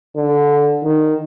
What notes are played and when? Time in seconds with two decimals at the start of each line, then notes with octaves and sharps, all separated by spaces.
0.16 D3
0.83 D#3